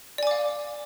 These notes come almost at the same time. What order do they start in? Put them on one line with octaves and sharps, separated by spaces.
D5 G#5 D6 F5